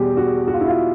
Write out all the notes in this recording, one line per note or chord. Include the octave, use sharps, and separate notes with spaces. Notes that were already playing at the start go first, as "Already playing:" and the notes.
Already playing: E2 B2 G3 G4 G#4
F#4
F#4
F4
E4
F4